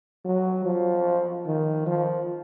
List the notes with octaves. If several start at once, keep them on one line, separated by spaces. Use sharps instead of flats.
F#3
F3
D#3
F3